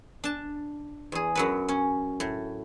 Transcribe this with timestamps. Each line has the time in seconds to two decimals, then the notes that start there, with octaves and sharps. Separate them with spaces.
0.24 D4 A5
1.12 E2 G#4
1.35 F#2 F#3 B4
1.68 C#4
2.20 A2